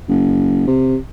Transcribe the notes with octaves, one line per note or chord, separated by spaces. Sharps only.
F#1
C3